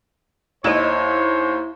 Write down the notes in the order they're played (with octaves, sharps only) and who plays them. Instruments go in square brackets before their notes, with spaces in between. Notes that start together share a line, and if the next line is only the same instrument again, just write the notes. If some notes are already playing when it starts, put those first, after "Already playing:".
[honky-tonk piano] D#2 E7 [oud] E4 D#5 [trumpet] C5 [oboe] C#5